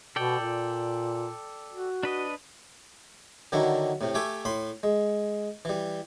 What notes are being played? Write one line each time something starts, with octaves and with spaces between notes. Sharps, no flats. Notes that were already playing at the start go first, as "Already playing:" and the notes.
B2 A4 D5 G5
A#2
F#4
D4 B4 D#5
D3 D#3 F#3 D4 E4
A2 C3
A3 G4 E5 G#5 D6
A2 B5 C6
G#3
E3 G3